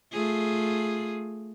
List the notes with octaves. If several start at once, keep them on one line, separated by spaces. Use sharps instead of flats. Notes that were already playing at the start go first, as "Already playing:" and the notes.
A3 F4 G#4